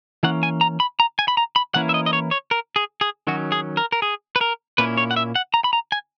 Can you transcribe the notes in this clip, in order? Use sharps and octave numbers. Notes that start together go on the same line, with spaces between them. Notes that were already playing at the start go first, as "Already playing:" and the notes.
E3 A#3 C#4 F#5
G#5
A#5
B5
A#5
G#5
B5
A#5
B5
E3 A#3 C#4 E4 F#5
E5
D#5
D#5
C#5
C#5
A#4
G#4
G#4
D#3 F#3 C#4 F#4
G#4
A#4
A#4
G#4
B4
A#4
A#2 A#3 C#4 E4 B4
C#5
F#5
E5
F#5
A#5
B5
A#5
G#5